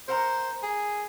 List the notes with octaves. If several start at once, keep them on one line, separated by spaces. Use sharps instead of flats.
A#4 C5 F#5 A#5
G#4